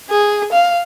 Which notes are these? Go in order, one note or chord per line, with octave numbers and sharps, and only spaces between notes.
G#4
F5